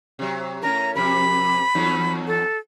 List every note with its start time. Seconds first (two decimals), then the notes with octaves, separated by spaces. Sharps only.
0.19 C3 F#3
0.63 A2 C#4 A#4 A#5
0.95 F2 C3 A#4 B5
1.75 E2 F#3 D#4
2.27 A4